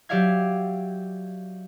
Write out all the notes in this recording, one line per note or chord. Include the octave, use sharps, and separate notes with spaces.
F#3 G4 D5 E5 F5 G#6